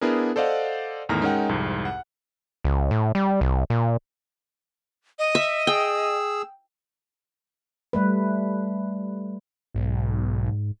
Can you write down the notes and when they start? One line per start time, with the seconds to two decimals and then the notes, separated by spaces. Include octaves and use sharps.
0.01 B3 D4 E4 G#4 A#4
0.36 A4 C5 D5 D#5 F5 F#5
1.09 E2 A2 D#3 A#5 F6
1.22 G#3 C#4 D#4 A#4 F#5 G5
1.49 C2 F2 G#2
1.85 F#5
2.64 C#2
2.91 A2
3.15 G3
3.41 C2
3.70 A#2
5.19 D#5
5.35 E5
5.67 G#4 G5 E6
7.93 G3 A3 B4
9.74 B1 G#2